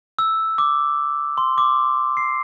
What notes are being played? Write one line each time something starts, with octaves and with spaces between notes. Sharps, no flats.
E6
D6
C6
D6
C7